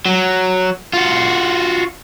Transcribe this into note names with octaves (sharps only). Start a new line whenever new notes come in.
F#3
F4 F#4